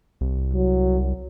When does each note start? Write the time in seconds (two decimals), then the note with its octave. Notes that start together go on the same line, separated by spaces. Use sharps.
0.21 C2
0.54 F#3